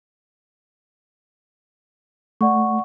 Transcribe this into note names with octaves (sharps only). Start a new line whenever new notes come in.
A3 D5 F#5 C#6